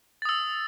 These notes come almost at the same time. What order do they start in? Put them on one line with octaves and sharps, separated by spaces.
A6 D#6 E6